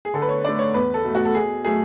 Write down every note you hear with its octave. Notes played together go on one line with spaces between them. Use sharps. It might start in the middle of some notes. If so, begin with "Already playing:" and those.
G#4
D3 A4
B4
C#5
A3 D4 D5
C#5
E2 B4
A4
B2 A3
F#4
A4
B2 G#4
F#3 A3 G#4